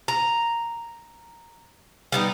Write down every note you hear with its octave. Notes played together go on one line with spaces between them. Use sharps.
A#5
G3 B3 D#4